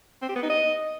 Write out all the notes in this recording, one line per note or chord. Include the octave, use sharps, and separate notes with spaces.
C4
G4
B3
D#4
D#5